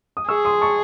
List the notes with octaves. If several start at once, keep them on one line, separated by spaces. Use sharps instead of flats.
D#6
G#4 C#6 E6
C6 D#6
A5 C#6